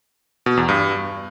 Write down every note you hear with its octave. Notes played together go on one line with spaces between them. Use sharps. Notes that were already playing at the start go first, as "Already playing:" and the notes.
B2
E2
G2